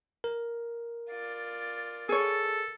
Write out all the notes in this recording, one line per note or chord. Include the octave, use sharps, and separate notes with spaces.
A#4
F4 D5
G#4 A4 C#5